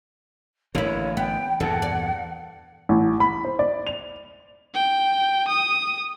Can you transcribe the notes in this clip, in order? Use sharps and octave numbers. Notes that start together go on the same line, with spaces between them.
A1 D3 A#3 E4 C#5
B3 G5
E2 G2 A#2 A4 F#5
D5
A1
B5
C5
D5
F7
G5
D#6